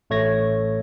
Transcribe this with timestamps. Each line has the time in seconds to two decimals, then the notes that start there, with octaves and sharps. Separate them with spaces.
0.10 A1 A3 C#5 G#6 A#6